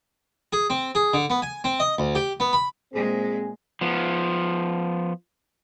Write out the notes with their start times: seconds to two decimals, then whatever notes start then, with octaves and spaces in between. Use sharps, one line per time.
0.53 G#4
0.70 C4
0.95 G#4
1.14 D3
1.30 B3
1.42 G#5
1.64 C4
1.80 D#5
1.98 D2
2.15 G4
2.40 B3
2.53 B5
2.93 A#2 G#3 C4 G#4
3.81 F3 B3